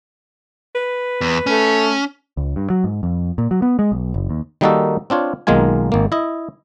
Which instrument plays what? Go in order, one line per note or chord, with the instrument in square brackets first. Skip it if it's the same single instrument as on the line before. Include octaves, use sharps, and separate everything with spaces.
[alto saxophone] B4
[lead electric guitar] E2
[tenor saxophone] A3 [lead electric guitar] C#4
[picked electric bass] C#2
G2
F#3
G#2
F2
A#2
F#3
B3
G#3
B1
F#1
D#2
[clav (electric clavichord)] D#3 G3 A#3 D#4 F#4 A4
C4 D4 F4 C#5
B1 D#3 G#3 A#3 F4 G#5
G#1 A#3
E4 D#5